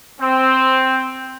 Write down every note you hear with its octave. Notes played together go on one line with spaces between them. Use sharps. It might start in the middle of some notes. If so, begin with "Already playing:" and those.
C4